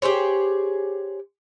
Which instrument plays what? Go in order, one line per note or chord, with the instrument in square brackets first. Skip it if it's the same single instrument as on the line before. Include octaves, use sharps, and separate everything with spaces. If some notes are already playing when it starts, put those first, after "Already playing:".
[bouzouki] G4 G#4 C5 C#5